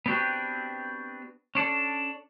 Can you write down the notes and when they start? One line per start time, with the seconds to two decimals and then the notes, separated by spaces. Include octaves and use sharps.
0.06 B3 C4 D4 F#4 G4 B4
1.55 C#4 D4 A4